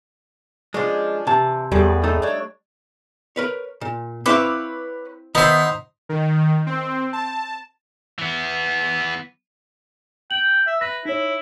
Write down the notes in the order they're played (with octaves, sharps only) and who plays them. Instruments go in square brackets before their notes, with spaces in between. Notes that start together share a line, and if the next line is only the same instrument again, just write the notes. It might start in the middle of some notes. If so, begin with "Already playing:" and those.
[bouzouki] F3 C#4 D4 [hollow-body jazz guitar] G#3
[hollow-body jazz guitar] C3 A5 [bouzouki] E3
[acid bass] E2 [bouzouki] A2 G#4 B4 [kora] G3
[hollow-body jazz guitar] A3 D#4
[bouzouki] D4 C#5
[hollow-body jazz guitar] A#4 B4 C#5
A#2
[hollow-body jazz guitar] C4 E4 F5 [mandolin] B4 C#5 D6
[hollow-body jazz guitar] D#3 [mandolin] B3 E5 [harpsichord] D#4 C5
[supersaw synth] D#3
C4
A5
[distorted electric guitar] E3 B3
[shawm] G5 [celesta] F#7
[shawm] E5
[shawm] B4 [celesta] E5 A#6
[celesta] D#4 C#5 [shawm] E4